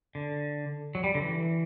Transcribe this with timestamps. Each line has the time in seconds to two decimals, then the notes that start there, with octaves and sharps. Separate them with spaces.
0.15 D3
0.95 F#3
1.04 G3
1.15 D3
1.22 E3